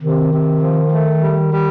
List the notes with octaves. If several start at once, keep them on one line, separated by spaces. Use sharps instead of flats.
C3 D#3
C3
F3
A3
G3
G3